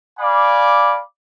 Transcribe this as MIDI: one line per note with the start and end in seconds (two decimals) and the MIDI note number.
0.19 0.99 74
0.19 0.99 77
0.19 0.99 80
0.19 0.99 83
0.19 0.99 86